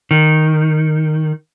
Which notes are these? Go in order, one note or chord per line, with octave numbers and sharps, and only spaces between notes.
D#3